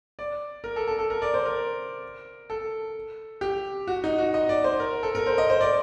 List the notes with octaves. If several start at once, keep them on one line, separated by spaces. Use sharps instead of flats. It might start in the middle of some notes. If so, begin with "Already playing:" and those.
D5
A#4
A4
A4
A4
A#4
D5
C5
A#4
A4
G4
F#4
D#4
F#4
D#5
D5
C5
A#4
A4
A#4
C5
D#5
C5
D5